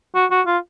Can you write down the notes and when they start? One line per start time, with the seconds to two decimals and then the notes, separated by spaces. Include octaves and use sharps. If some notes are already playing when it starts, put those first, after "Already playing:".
0.15 F#4
0.31 F#4
0.47 F4